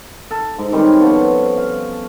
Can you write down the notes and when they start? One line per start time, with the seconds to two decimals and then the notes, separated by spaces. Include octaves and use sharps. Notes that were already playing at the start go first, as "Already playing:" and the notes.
0.31 A4
0.58 G#2
0.72 D#3 G3 C4 C#4
1.01 F3 B3 A4 C#5
1.57 F5